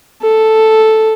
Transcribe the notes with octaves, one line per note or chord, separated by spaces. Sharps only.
A4